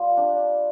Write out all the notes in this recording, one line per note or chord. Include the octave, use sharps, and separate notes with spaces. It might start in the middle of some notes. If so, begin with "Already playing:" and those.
Already playing: G3 F4
D4